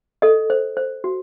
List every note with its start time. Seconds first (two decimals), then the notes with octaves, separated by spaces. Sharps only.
0.22 A4 D#5
0.50 C5
0.77 C5
1.04 F#4